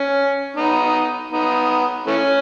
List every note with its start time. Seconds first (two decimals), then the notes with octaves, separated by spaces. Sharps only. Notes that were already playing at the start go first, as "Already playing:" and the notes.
Already playing: C#4
0.56 B3 D#4
1.32 B3 D#4
2.06 E3 A3 C#4